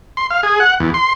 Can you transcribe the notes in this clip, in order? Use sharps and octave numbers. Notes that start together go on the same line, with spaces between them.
C6
F5
G#4
F#5
E2
C6